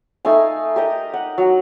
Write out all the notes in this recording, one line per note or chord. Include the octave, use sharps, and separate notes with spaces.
A3 D#4 F5 G#5
G4 A#4 D#5
F#5
F#3